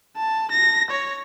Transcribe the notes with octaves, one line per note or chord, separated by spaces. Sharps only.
A5
A#6
C#5